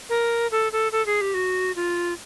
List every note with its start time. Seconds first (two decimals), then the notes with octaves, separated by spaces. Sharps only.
0.09 A#4
0.52 A4
0.72 A4
0.92 A4
1.06 G#4
1.21 G4
1.34 F#4
1.76 F4